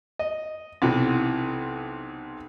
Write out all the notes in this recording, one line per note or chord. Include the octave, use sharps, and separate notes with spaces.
D#5
B1 C3 E3